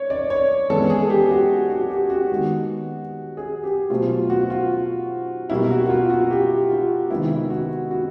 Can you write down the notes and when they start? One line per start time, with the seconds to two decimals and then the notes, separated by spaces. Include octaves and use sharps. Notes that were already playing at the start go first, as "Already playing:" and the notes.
Already playing: C#5 D5
0.10 D5
0.30 C#5
0.70 E3 G#3 B3 A4
0.90 G#4
1.10 G4
1.30 F#4
1.70 F#4
1.90 G4
2.10 F#4
2.29 D#3 G#3 B3
3.37 G#4
3.64 G4
3.90 B2 F#3 A3 C4 F4
4.10 F4
4.30 F#4
4.50 F4
5.50 B2 G3 A#3 E4
5.70 F#4
5.86 F#4
5.90 F4
6.10 F#4
6.30 G4
6.70 F4
7.10 C3 D#3 G#3 B3 E4
7.31 E4
7.50 F#4
7.91 F#4